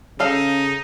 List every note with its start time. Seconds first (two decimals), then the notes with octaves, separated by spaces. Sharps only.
0.20 C#3 D#4 A4 F5